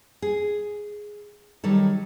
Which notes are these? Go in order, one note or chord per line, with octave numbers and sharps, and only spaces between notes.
G#4
D#3 F#3 G3 A4